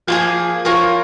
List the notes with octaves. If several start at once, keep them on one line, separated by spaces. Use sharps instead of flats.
F3 A#3 F4 G#4
F3 F4 A#4 C#5